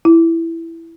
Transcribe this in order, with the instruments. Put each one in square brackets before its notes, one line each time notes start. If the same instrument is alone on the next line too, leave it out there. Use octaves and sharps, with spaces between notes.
[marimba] E4